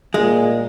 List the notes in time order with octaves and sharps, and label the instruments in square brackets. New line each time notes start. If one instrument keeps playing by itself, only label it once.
[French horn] A#2 [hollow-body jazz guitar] G#3